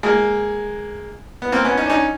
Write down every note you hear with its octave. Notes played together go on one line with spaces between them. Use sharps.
G#3 A#3
B3
A#3 C4
B3 C#4
C#4 D#4
D4
C#4 D#4